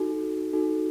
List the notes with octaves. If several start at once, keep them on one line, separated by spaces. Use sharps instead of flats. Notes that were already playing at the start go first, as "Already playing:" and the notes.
Already playing: D#4 F#4 A4
D#4 F#4 A4